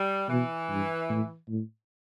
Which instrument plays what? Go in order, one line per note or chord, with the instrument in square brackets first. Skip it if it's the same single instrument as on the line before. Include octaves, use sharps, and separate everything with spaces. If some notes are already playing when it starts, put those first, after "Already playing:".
Already playing: [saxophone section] G3
[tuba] B2 [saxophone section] E3
[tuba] G2
A2
A2